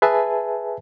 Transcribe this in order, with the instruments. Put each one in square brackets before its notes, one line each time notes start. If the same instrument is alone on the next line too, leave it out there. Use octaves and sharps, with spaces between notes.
[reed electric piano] G#4 B4 E5 G#5 A5